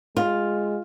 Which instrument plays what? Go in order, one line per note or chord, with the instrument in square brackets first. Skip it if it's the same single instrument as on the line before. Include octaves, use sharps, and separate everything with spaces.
[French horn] G#3 [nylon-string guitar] F4